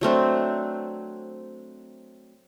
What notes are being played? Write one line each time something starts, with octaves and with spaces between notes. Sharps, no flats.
F#3 A3 C4 D4